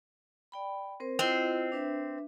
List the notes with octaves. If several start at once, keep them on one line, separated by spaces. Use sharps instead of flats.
D5 G5 B5
C4 A#4 C5
C4 E4 F4 D#5
D4 B4 E5